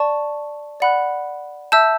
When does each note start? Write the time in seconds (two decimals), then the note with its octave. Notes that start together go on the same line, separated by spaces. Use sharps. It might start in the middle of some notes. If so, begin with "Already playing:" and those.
Already playing: D5 A5 C#6
0.80 D5 F#5 B5 F#6
1.72 E5 A5 E6 G6